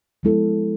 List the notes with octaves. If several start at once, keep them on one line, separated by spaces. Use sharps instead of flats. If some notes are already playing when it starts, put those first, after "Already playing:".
F3 G#3 B3 E4 A4